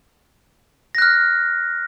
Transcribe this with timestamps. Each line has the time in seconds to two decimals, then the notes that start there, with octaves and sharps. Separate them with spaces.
0.95 A#6
0.98 F#6
1.02 F6